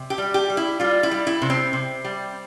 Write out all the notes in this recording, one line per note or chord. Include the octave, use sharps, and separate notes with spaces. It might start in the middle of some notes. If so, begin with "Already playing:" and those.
Already playing: C3
G4
G3
G4
G3
E4
G3 F4
E4
G3
E4
C3
C4
C3
G3